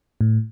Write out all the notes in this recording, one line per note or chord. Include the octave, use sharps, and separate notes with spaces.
A2